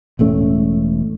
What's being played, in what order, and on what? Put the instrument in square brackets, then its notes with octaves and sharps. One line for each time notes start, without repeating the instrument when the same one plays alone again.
[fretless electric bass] E1 A2 A3 C#4